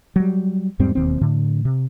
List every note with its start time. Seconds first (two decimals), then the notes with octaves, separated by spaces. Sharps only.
0.16 F#3 G3
0.79 E2 G#2 G3 C4
0.95 E1 D#2 C4
1.21 A2 D3
1.65 C3